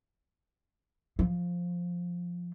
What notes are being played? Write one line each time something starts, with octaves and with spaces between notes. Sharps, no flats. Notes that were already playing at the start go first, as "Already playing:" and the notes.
F3